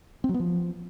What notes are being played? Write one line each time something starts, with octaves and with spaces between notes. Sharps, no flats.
C4
F#3
B3
F3